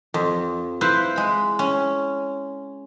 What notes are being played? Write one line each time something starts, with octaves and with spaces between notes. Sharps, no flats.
F2
E4 B4 C5 F5
G#3 B5
C#4